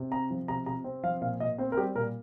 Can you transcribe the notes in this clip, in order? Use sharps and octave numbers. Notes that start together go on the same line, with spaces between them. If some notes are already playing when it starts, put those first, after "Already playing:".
Already playing: C3
C4 A#5
F3
C3 A#5
C3 A#5
C4
F3 F5
A#2 F5
A#2 D#5
C4 C5
A#4
G3 G4
A#2 A#4